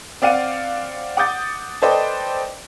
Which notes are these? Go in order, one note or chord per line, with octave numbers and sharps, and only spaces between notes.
C4 D5 F5 F#5 D#7
F#5 D6 D#6 G6 A6
A4 B4 C5 D5 D#5 G5